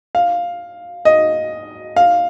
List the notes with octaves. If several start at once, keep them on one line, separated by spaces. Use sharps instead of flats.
F5
D#5
F5